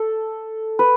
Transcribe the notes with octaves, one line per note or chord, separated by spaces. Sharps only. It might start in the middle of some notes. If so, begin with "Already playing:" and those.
Already playing: A4
B4